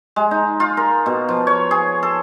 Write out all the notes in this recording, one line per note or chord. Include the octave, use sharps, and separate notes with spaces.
G#3
D#4
F4
A#4
B2
F3
C#5
G#4
A4